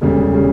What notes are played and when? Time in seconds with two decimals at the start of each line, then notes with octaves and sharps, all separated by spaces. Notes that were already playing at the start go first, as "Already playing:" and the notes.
0.01 E1 D2 C#3 G3
0.34 C#3 G3